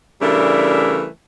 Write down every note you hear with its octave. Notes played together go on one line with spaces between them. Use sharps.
C#3 E3 G3 A3 D4 A#4